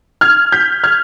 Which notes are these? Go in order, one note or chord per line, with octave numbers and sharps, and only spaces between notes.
F6 G#6
G6 B6
F6 G#6